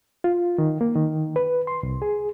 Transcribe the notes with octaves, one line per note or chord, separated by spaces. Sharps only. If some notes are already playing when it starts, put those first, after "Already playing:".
F4
D#3
A#3
D#3
B4
C6
C2
G#4